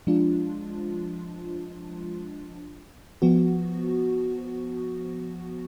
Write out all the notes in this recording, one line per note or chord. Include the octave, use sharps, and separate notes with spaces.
F3 G#3 D4 F4
F3 B3 F#4